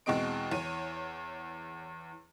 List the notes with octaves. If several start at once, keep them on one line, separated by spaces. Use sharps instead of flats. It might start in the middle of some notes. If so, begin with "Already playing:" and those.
E2 B2 G#3 C4 D#5 D7
E2 C#5 D#7